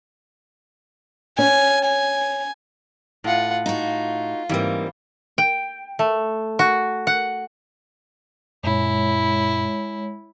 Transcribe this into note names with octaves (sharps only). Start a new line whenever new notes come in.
C#4 G#5
G#5
A2 F4 F#5
D#4 F4 F#4
G#2 E3 G3 A#3 C4
G5
A3
F#4
F#5
F#2 A#2 G#3 E4 C#5